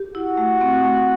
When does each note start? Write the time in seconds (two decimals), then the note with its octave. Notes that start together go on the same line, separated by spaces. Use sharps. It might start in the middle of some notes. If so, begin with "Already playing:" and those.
Already playing: G4
0.15 E4 F#4
0.38 A3
0.61 C4
0.84 A3